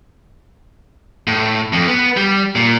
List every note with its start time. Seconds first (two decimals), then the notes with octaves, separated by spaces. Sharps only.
1.27 A2
1.73 F2
1.88 B3
2.17 G3
2.55 A#2